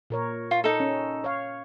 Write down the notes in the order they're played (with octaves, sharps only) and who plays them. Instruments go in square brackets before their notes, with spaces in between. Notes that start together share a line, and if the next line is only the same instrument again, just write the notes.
[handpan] A#2 A#4 C#5
[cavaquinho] F4
D#4 A4
[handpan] C#4
C#5 F5